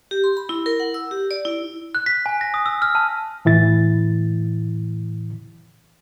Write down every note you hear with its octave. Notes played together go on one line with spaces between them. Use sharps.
G4
C6
B5
E4
A#4
F#5
E6
G4
D5
E4
F#6
B6
G#5
A#6
D#6
E6
F6
A5
A2 E3 E4 A6